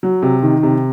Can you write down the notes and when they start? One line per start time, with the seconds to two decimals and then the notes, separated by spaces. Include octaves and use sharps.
0.03 F#3
0.22 C3
0.43 D#3
0.63 C3